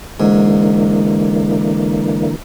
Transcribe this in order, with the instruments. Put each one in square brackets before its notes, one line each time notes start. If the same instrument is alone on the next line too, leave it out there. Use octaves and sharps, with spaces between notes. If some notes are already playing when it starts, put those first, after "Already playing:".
[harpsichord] G#2 [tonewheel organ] D3 E3 A#3